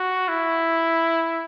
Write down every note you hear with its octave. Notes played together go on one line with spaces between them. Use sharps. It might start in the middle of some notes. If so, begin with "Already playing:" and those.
Already playing: F#4
E4